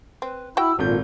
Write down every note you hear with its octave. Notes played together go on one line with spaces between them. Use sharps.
C4 B4
E4 F#4 G5 E6
G#1 A#2 F4 A4 G6